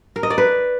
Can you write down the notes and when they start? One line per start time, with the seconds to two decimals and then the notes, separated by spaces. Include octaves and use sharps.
0.16 A#4
0.23 D#5
0.30 D5
0.38 B4